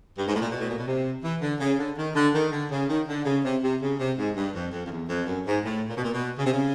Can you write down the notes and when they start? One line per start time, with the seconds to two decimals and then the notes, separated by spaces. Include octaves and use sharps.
0.18 G2
0.27 G#2
0.35 A2
0.42 A#2
0.50 B2
0.59 A2
0.69 A#2
0.78 B2
0.87 C3
1.23 E3
1.41 D3
1.60 C#3
1.78 D3
1.98 D#3
2.15 D3
2.34 D#3
2.52 D3
2.71 C#3
2.89 D#3
3.08 D3
3.25 C#3
3.44 C3
3.63 C3
3.81 C#3
3.99 C3
4.18 G#2
4.37 G2
4.55 F2
4.72 F2
4.85 F2
4.91 E2
5.09 F2
5.27 F#2
5.46 G#2
5.64 A2
5.89 A#2
5.97 B2
6.04 A#2
6.14 B2
6.38 C#3
6.46 C3
6.53 C#3